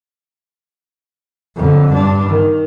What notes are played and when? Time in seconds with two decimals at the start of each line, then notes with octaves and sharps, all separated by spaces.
1.56 F2 D3
1.93 G2 D4
2.29 D#3